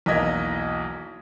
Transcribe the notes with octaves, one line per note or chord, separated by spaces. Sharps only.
B1 E2 A#3 D#5 G#6 B6